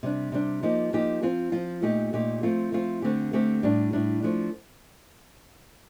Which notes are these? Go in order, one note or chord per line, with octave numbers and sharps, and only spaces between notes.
C3 G3 D4
C3 G3 D4
F3 A#3 D#4 G4
F3 A#3 D#4 G4
F3 C4 F4
F3 C4 F4
A#2 A3 D#4 G4
A#2 A3 D#4 G4
F3 A3 C4 F4
F3 A3 C4 F4
D3 A3 C4 G4
D3 A3 C4 G4
A2 G3 D4
A2 G3 D4
F3 A3 D4